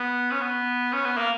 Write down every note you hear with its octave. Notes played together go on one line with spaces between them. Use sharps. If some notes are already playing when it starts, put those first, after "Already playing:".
Already playing: B3
C#4
B3
C#4
B3
A#3